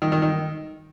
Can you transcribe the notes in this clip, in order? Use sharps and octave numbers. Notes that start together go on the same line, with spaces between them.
D#3
D#3
D#3